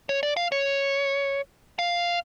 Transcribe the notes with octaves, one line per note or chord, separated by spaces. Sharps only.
C#5
D5
F5
C#5
F5